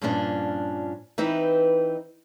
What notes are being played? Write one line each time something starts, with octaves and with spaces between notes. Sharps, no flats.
G2 A#2 F3 C#4 D4
E3 C4 D#4 B4